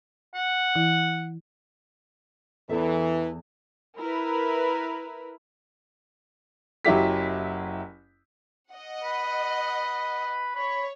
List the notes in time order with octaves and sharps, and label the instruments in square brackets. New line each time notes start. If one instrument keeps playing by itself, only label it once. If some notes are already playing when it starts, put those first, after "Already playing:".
[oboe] F#5
[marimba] E3 E4
[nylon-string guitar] E2 A4 E5 [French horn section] E3
[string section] E4 A#4 B4
[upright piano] F#1 F#3 E4 G4 B6
[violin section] D#5 F#5
[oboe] B4
[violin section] C#5 [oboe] B5